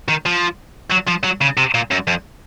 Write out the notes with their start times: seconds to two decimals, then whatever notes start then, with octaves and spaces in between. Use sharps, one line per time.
0.09 D#3
0.26 F3
0.91 F#3
1.08 F3
1.24 F#3
1.42 C#3
1.57 C3
1.74 A#2
1.91 F#2
2.07 F2